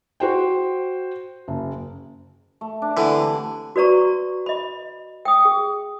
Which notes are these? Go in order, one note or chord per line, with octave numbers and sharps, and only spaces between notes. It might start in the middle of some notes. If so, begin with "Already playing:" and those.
F#4 C5 G5
F#1
A3
D4
D3 E3
C3
F#4 B4 D5 A#5 C#6
D#5 B5
G5 D#6
G#4